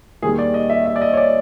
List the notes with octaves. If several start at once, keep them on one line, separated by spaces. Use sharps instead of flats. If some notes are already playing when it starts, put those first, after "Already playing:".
D#2 D#3 G3 G#4
D5
D#5
E5
E5
D5
D#5
C#5
D5